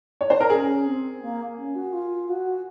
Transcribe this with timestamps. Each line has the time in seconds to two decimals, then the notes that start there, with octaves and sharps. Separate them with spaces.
0.21 C#5
0.30 C5
0.40 A#4
0.50 C#4 G#4
0.85 C4
1.21 A#3
1.57 C#4
1.74 F#4
1.92 F4
2.28 F#4